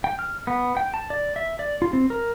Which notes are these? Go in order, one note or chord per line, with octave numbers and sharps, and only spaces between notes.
G5
F6
B3
G5
A5
D5
E5
D5
F4
C4
A#4